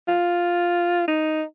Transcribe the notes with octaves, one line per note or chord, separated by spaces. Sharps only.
F4
D#4